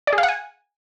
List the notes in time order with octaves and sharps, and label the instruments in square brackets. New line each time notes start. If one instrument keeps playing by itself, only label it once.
[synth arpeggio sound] D5
G#4
F5
F#5
G#5